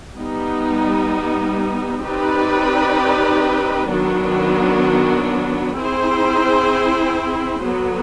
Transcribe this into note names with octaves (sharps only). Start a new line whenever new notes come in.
G3 B3 D#4
C4 D#4 G4 B4 D5
D#3 F#3 B3 D4
C4 E4 G#4 C5
D3 F#3 B3